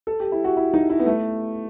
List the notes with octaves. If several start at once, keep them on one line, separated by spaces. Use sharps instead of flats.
A4
G4
E4
F#4
E4
D#4
E4
B3
A3